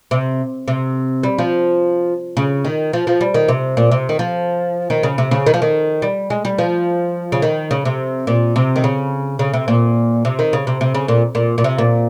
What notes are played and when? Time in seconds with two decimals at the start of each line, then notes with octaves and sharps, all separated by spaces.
0.11 C3
0.68 C3
1.23 G3
1.38 F3
2.37 C#3
2.65 D#3
2.93 F3
3.07 F3
3.21 G3
3.34 D#3
3.48 C3
3.77 A#2
3.91 C3
4.09 D#3
4.19 F3
4.90 D#3
5.03 C#3
5.18 C3
5.31 C#3
5.46 D#3
5.54 F3
5.62 D#3
6.02 G3
6.30 G#3
6.45 G3
6.58 F3
7.32 C#3
7.42 D#3
7.71 C#3
7.85 C3
8.27 A#2
8.56 C3
8.76 D#3
8.84 C#3
9.39 C#3
9.53 C3
9.68 A#2
10.25 C3
10.39 D#3
10.53 C#3
10.67 C3
10.81 C3
10.95 C#3
11.08 A#2
11.35 A#2
11.58 A#2
11.64 C3
11.78 A#2